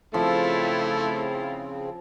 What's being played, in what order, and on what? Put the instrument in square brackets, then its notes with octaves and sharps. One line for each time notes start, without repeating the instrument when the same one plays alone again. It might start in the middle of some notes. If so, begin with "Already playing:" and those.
[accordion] C#3 C4 [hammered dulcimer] F3 [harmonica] A3 [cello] E4 F4